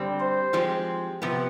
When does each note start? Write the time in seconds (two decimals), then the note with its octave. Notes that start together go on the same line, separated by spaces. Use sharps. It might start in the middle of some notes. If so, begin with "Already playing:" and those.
Already playing: D3 G3 C4
0.20 C5
0.53 F3 G#3 C4 G4
1.22 C3 F3 B3